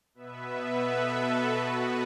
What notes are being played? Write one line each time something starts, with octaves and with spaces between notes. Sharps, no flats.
B2 B3 B4 E5
A4
F#4 B4
B2 B3